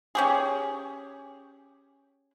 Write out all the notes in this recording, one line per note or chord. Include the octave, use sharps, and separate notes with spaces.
C#4 G4 G#4